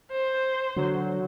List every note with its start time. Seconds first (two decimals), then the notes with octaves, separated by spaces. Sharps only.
0.12 C5
0.76 D3 F#3